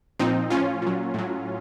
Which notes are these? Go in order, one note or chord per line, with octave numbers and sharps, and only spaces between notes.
A#2 F3 C4 D#4
A2 F3 C#4 F4
A#2 F#3
A2 F#3